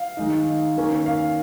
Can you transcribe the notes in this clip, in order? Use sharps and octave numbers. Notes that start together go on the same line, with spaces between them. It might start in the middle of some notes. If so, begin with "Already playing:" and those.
Already playing: F5
D#3 G#3 D#4
D#3 A#3 C#4
F5